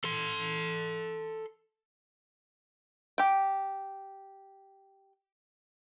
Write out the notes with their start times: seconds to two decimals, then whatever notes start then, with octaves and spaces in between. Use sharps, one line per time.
0.04 A4 C6
3.18 G4 G5